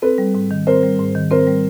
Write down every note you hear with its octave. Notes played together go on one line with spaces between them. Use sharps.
C4 A4 B4
G3
G#2
D#3
C4 A#4 C5
G3
G#2
D#3
C4 A#4 C5
G3